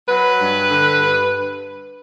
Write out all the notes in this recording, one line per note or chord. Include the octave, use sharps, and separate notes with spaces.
F#3 B4
G2
D3
G2